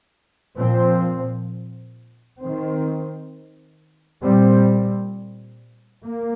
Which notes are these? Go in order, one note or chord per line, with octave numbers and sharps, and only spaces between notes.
A#2 F3 C4
D#3 C4
A#2 G3 C4
A#3